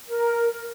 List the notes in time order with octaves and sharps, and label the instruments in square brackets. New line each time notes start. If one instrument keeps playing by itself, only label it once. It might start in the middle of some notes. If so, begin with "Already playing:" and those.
[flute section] A#4